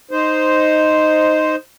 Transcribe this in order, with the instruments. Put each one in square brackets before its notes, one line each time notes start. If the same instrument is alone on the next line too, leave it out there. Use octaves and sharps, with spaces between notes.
[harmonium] D#4 C5